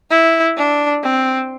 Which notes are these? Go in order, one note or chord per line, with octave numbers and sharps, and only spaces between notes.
E4
D4
C4